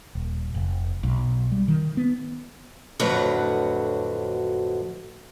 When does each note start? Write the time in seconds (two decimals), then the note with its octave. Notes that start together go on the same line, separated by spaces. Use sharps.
0.15 D#1
0.54 F1
1.03 B1
1.52 G3
1.68 D#3
1.97 B3
2.99 F2 A2 D3 F#3 F#4 B4